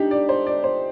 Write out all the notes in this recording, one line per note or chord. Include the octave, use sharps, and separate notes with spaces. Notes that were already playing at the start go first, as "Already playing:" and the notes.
Already playing: D4 D#4 G4
D5
C5
D5
C5